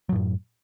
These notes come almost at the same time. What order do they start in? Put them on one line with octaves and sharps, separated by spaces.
F#3 A2 F#2